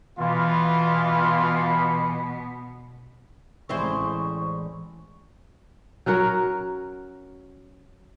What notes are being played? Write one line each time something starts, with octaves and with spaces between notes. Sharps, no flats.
B2 E3 B3 F4
A1 G#3 C4 E4 C5 D5 C#6
F#3 C#4 F#4 A#4